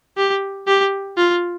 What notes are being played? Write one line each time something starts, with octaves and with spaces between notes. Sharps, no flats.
G4
G4
F4